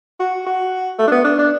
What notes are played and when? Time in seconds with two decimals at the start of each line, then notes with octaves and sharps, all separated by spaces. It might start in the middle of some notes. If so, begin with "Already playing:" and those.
0.20 F#4
0.46 F#4
0.99 A3
1.07 D4
1.12 B3
1.25 D4
1.39 D4